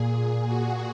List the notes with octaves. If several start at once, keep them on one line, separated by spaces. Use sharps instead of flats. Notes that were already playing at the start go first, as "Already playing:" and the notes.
Already playing: A#2 G#4
F#4